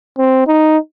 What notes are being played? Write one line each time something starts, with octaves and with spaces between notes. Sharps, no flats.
C4
D#4